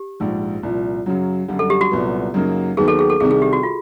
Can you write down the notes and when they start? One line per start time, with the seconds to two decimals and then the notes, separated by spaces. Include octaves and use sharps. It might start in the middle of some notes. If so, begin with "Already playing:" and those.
Already playing: G4
0.20 A#1 G#2 F3
0.63 C2 A#2 F3
1.06 F#2 C#3 F#3
1.48 F#2 D3 G3
1.59 A4
1.70 G4
1.81 F#4
1.91 C2 A#2 F#3 B3
2.34 F#2 C#3 F#3 A#3 D#4
2.77 D#2 D#3 F#3 B3 G#4
2.88 A4
2.99 G#4
3.10 A4
3.20 C2 C3 D#3 G#4
3.31 G#4
3.42 G4
3.53 F#4
3.63 F4